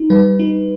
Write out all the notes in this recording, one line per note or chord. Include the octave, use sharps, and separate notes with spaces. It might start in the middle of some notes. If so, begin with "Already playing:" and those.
Already playing: D#4
G3 B4
D#4